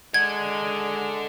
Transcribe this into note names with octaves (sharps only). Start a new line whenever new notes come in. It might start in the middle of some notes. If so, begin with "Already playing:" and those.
D3 G#3 F#5 G#6